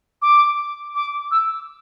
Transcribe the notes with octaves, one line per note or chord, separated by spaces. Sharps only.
D6
D6
E6